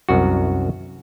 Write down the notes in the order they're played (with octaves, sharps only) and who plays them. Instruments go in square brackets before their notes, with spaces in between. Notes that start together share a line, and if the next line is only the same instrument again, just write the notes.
[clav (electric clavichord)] C2 F#2 F#4